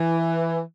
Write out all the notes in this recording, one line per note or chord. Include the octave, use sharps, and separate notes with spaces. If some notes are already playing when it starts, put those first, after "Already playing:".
Already playing: E3